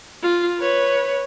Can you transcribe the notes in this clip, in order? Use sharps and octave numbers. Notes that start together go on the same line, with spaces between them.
F4
B4 C#5